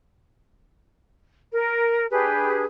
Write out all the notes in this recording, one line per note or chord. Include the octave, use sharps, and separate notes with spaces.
A#4
D4 G4 G#4 B4